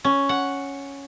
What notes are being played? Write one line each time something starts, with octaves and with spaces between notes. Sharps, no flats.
C#4
F#5